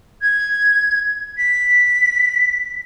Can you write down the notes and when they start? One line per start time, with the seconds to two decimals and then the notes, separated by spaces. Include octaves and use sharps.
0.21 G#6
1.37 B6